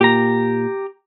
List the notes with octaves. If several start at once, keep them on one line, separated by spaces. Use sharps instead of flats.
A#2 G4 A#5